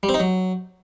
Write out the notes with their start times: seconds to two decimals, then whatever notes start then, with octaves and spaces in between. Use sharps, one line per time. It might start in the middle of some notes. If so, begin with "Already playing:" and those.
0.03 G3
0.09 C4
0.14 D#4
0.20 F#3